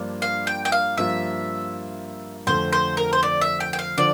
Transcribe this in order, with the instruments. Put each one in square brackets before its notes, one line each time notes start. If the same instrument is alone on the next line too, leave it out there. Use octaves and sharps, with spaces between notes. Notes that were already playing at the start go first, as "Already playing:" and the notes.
Already playing: [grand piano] G2 F3 A#3 D4 F4
[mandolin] F5
G5
G5
F5
[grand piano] G2 F3 A#3 F4 [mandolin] E5
[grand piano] F2 D3 A3 [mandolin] C5
[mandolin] C5
A#4
C5
D5
E5
G5
G5
F5
[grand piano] D3 F3 [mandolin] D5